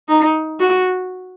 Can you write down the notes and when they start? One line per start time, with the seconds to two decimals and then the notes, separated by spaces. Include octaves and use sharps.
0.09 D#4
0.60 F#4